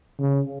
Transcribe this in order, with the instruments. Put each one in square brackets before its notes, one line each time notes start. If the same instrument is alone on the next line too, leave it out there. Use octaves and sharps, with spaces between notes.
[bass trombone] C#3